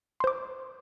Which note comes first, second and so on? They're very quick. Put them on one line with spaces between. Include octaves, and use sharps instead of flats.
C6 C5 D6